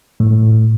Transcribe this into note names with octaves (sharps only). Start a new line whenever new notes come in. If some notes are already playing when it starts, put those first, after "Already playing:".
A2